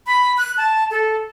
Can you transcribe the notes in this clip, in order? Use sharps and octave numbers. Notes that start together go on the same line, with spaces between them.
B5
F#6
A5
A4